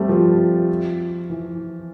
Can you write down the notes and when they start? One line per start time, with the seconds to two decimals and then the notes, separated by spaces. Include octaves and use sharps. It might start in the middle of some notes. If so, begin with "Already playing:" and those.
Already playing: G3 A3 C4
0.09 F3
1.30 E3